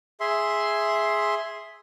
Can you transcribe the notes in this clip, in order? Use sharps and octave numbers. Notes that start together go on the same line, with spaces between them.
G#4 E5 C6